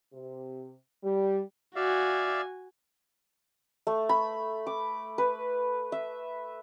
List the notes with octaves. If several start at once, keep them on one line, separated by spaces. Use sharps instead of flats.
C3
G3
F#4 D5 E5 F5 G#5
A3
B5
D6
B4
E5